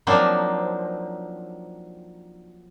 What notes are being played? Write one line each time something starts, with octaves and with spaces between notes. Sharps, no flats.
F3 F#3 A#3 C4 D4 D#4